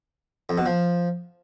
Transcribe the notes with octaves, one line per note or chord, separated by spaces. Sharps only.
F2
B2
F3